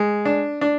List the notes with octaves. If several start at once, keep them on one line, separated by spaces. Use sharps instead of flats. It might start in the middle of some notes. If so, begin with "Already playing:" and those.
Already playing: G#3
D4
D4